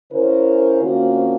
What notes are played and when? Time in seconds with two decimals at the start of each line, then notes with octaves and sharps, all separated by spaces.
0.13 C#3 C#4 E4 A#4 C5
0.82 D2 A#3 C4 C#4 F4 F#4